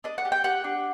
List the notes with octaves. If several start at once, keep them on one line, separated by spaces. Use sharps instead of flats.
D4 D#5
F#5
G4
G5
G4 F#5
D4